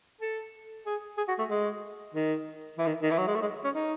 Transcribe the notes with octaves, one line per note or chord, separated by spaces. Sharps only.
A4
G#4
G#4
F#4
A3
G#3
D#3
E3
D#3
D#3
E3
F#3
G#3
A3
G#3
C#4
D#4